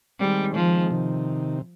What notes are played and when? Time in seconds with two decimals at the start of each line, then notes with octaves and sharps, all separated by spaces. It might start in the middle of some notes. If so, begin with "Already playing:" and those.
0.20 D#3 G3 G#3 C4
0.55 F3
0.91 C3 D#3